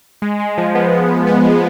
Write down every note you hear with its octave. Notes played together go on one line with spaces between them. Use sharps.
G#3
G#3
F3
B3
G#3
F3
B3
G#3